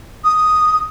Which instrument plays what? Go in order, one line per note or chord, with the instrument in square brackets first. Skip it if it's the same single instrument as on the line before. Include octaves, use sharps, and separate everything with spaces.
[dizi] D#6